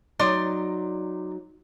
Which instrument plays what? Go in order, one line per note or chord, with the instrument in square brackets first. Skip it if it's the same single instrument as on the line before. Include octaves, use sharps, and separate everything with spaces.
[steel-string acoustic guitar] F#3 D#4 [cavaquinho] D5 C6 D#6